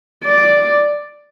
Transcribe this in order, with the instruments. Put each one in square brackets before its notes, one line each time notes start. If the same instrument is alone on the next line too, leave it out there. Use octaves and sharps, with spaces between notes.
[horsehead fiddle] D5